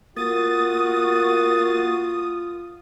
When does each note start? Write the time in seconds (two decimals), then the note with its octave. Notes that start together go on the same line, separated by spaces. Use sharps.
0.17 A#3 F4 F#4 D#6 A6